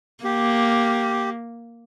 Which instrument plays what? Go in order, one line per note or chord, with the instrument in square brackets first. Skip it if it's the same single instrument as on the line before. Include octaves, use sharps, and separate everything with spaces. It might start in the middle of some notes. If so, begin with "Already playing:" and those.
[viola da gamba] A#3 [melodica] G4